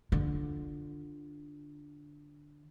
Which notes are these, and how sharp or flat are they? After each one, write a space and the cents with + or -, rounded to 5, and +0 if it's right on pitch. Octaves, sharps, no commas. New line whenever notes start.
D3 +0 F4 +0